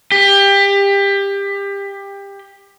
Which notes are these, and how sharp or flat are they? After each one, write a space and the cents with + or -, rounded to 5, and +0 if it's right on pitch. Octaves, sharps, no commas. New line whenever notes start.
G4 +25